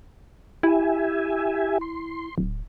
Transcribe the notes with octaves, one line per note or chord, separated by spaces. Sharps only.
E4 G4 E5 G#5
C6
D1